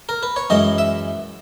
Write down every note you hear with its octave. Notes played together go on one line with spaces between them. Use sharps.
A#4
B4
C#5
F#2 E3 G#3 D#5
E5